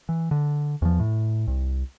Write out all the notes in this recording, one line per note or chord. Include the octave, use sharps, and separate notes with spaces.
E3
D3
E2 F3
A2
C2